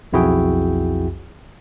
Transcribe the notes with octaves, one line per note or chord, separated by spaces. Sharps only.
B1 F2 E4 F#4 G#4 G5